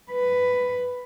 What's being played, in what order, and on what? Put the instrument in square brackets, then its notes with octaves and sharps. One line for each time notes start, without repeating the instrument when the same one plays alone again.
[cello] B4